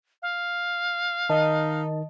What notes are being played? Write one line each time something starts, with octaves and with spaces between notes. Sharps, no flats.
F5
D#3 D#4 D#5 A5